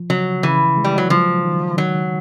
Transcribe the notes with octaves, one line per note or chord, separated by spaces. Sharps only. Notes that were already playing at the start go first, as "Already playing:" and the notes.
Already playing: F3
C#3 F#3
C#3 E3
G#3
G3
F#3
F3 F#3
D#3
D#3 F#3